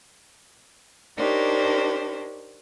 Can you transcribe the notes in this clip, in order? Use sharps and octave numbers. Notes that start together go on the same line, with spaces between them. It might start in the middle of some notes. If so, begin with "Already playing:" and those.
D4 D#4 G4 A#4 C5 C#5